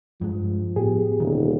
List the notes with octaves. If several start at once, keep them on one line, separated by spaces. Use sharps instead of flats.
G2 F3 G#3
A2 B3 G4 G#4
D#1 B2 D3 D#3